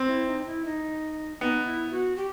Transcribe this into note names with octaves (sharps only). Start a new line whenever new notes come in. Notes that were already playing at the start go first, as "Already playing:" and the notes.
Already playing: C4
E4
D#4
E4
D#4
B3 D#4
E4
F#4
G4